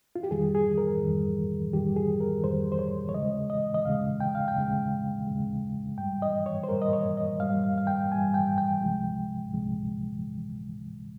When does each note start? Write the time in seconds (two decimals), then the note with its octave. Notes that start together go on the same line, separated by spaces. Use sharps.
0.16 F4
0.23 G4
0.31 F2 D#3 G3 G#4
0.55 G#4
0.78 A#4
1.02 F2 D#3 G3
1.73 F2 D#3 G3 G4
1.96 G#4
2.21 A#4
2.43 F2 D#3 G3 C5
2.72 C5
2.79 C#5
3.09 C#5
3.14 D#2 C#3 G#3 D#5
3.50 D#5
3.74 D#5
3.85 D#2 C#3 G#3 F5
4.20 G5
4.35 F5
4.48 G5
4.56 D#2 C#3 G#3
5.28 D#2 C#3 G#3
5.98 G2 G3 G5
6.22 D#5
6.46 C#5
6.64 C5
6.69 G2 G3 A#4
6.82 D#5
6.93 C#5
7.17 D#5
7.40 G2 G3 F5
7.64 F5
7.78 F5
7.87 G5
8.11 G2 G3 G#5
8.34 G5
8.58 G5
8.81 C#2 C3 F3 G#3
9.53 C#2 C3 F3 G#3